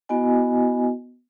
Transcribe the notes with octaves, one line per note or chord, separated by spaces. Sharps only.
B3 E4 F#4 D#5 G#5